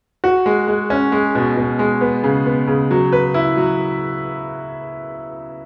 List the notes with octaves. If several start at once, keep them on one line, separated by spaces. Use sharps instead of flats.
F#4
G#3
G#3
C#4
G#3
B2
B2
G#3
B3
C#3
B3
C#3
F#3
B4
E4
F#3